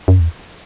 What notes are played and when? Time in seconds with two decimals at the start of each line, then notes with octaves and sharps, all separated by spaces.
0.08 F#2
0.20 E2